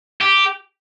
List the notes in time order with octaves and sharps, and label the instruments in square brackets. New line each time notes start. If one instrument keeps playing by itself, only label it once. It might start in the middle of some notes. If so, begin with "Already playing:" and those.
[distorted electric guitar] G4